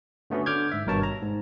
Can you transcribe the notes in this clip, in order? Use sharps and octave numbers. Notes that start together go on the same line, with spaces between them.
D3 A3 B3 C#4 F#4
D3 D6 F6 G6 G#6
G#2 E5
G#1 G2 B2 A#4 C#5 A5
A#5
G#2